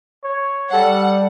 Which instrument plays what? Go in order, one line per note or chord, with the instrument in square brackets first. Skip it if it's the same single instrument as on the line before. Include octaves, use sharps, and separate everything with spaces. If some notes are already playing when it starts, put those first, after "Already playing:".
[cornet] C#5
[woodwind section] G3 [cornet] A4 [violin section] F#5